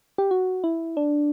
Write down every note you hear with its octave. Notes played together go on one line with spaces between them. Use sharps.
G4
F#4
E4
D4